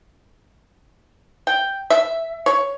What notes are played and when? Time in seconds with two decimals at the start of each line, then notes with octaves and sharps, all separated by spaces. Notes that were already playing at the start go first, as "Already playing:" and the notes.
1.47 G5
1.90 E5
2.46 C#5